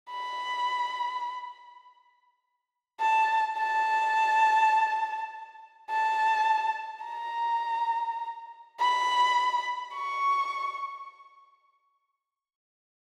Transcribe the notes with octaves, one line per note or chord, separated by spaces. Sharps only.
B5
A5
A5
A5
A#5
B5
C#6